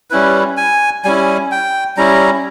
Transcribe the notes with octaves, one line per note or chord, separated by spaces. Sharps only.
G3 C#4 E4 B4
G#5
G3 C#4 E4 G#5
G5
G3 C#4 E4 A#5